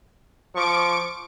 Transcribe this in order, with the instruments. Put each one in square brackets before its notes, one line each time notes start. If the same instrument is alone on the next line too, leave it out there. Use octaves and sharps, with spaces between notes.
[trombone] F3 [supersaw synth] C#6 D6 D7